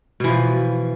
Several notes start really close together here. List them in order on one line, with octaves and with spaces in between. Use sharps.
B2 E3 F3